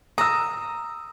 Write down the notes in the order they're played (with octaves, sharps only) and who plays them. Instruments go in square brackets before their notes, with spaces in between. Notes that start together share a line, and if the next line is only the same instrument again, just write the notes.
[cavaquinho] A#5 [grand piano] D#6 E6